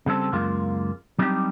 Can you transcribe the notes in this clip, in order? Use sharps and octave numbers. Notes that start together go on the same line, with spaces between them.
C#3 G3 C4 A4
C#2 F#2 G#3 A#3 F4
F#3 G3 C4 D4 D#4 G4